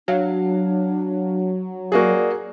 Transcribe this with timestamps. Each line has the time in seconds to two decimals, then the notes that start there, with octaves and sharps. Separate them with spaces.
0.08 F#3 D4 F5
1.92 A#3 F#4 G#4 D5